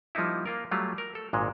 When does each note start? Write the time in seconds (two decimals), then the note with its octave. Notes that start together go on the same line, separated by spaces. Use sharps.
0.15 F3 G3 A#3 D#4 E4
0.46 A#3 F4 A#4
0.71 F#3 G3 A3 F4
0.98 A#4
1.15 A4
1.33 G#1 A#2 G#3